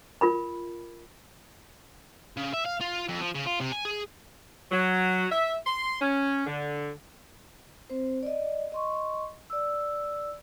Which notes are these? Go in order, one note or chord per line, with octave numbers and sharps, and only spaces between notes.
F4 A#4 B5
C#3
E5
F5
F4
F2
F3
C#3
F4
C3
G#5
G#4
F#3
E5
C6
C#4
D3
C4 C5
D5 D#5
D#5 C6 C#6
D5 E6